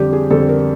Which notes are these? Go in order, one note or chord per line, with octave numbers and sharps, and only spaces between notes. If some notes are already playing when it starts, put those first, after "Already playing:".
Already playing: F2 D3 G3 G4
G#4
F2 D3 G3 A4
A#4